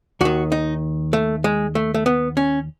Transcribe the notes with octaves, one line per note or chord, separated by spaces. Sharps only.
D#2 D#3 F#4
D#4
A3
G#3
A3
A3
B3
C#4